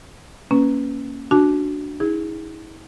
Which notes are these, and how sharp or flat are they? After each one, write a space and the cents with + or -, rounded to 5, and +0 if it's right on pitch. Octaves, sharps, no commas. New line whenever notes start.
A#3 +0 C#4 +0 B4 +0
D4 +0 F#4 +0 A5 -30
E4 -40 G#4 -15